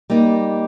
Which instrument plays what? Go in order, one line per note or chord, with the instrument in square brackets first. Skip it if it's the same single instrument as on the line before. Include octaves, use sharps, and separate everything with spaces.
[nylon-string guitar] G3 A#3 D#4